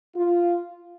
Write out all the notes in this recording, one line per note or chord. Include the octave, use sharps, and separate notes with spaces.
F4